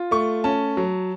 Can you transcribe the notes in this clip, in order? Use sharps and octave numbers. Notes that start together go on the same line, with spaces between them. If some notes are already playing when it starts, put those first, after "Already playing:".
Already playing: F4
A3 C#6
C#4 A5
F#3